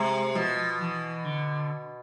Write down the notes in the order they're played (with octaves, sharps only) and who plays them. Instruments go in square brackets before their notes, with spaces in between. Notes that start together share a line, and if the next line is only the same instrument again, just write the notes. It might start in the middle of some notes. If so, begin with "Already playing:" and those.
Already playing: [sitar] C3 [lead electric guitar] G#3
[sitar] B2 [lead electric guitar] F3
[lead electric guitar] E3
D3